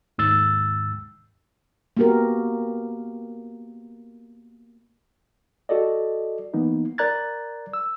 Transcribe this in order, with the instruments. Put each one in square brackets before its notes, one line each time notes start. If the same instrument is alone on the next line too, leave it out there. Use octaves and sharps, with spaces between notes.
[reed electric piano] D#2 G#2 E6 A6
[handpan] A#3 B3 F#4 G4 A#4
[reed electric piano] F#4 A4 D5 D#5
E3 A#3 B3 D#4
A#4 D5 A#5 F#6 G#6 A6
E6